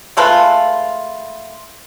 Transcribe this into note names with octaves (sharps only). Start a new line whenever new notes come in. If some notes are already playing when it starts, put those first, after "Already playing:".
G#3 A3 F4 B4